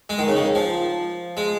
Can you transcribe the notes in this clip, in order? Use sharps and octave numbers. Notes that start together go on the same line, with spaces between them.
G#3
D#3
C#3
D#3
F3
G#3